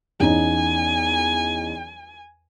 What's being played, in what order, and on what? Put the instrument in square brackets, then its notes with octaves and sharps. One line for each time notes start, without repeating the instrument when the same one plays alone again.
[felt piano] E2 C#4 D#4 [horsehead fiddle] G#5